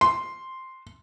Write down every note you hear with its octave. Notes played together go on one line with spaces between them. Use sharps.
C6